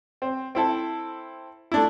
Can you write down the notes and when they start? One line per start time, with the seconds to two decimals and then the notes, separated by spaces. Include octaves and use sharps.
0.22 C4
0.55 C4 E4 A4
1.72 A3 D4 E4